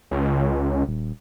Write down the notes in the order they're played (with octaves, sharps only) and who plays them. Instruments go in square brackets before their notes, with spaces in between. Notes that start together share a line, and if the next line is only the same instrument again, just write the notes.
[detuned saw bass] C#2
[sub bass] D#1